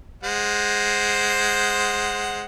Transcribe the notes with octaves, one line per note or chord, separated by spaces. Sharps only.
G#3 C5 F#5